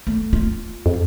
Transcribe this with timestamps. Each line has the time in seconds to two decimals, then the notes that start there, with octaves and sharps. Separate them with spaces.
0.07 A3
0.33 F4
0.86 F2